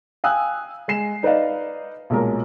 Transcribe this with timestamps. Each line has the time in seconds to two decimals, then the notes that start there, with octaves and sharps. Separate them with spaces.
0.24 F5 G5 G#5 D#6 E6 F#6
0.88 G#3 G#5 C7 E7
1.23 D#4 B4 D5 D#5 F5
2.10 B1 A#2 G#3 A#4